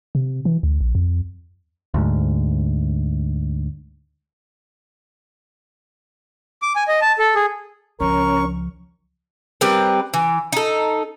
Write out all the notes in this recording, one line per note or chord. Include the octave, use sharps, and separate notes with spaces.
C3
E3
D2
A#1
F2
D2 G#2
D6
G#5
D#5
A5
A4
G#4
C#2 F3 C#4 A#4 C#6
G3 C4 A#4 B4
E3
D#4 A4